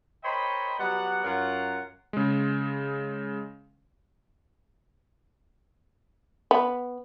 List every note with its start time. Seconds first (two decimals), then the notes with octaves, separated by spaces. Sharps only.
0.24 A#4 C5 C#5 D#5 G5 B5
0.80 F#3 G3 B3 F#5
1.24 F#2 F4 A#4 C#5 F#5
2.13 C#3 G#3
6.51 B3